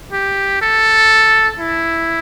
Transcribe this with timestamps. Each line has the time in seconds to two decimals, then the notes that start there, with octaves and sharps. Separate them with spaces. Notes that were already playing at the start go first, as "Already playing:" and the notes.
0.13 G4
0.62 A4
1.59 E4